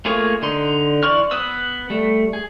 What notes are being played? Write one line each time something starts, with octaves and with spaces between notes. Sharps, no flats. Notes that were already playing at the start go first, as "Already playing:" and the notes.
A3 A#3 F4 G#4 C#5
D3 D#4 C6
E3 D5 C6 C#6 F6
B3 B4 D#6 E6
G3 A3
G#4